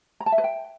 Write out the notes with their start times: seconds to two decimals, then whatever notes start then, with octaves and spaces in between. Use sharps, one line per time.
0.20 A#5
0.26 A5
0.32 E5
0.38 B4
0.44 G5